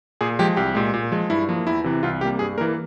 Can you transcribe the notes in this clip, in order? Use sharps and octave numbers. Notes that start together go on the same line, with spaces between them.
A#2 G#4
F3 G#3 G4
C2 G4
A#2 G#3
A#2
F3 G#3
G2 E4
F3 A#3
E2 E4
C3 E3
C2 F4
C3 G3 A#3 G4
G2 G#4
E3 A#3 A#4